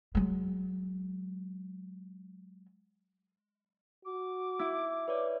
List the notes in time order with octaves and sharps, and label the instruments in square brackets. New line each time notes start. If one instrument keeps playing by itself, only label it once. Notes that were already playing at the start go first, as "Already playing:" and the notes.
[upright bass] F#3 G#3
[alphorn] F#4 [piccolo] D6
[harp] E4
[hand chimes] B4 C#5 D5